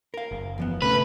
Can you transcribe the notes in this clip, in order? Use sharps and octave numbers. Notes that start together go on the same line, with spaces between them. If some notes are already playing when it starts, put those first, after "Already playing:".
A#4 F5
F#1
E2 F3 B3
D2 A2 C3 A3 C#4 B4